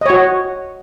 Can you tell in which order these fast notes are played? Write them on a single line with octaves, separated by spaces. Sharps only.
D#5 C#5 F#4